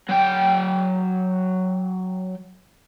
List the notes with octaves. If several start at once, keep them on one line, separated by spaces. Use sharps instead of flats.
F#3 G5